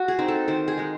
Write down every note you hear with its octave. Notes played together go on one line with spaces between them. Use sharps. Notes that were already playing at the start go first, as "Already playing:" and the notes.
Already playing: F#4
G#4
C4 D#4
A4
D#3 C5
G#4
G#3 D#4